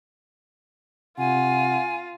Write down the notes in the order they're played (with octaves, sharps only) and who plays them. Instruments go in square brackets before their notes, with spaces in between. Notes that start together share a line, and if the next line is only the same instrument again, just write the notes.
[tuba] C3 [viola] F4 [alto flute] F#5 [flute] G#5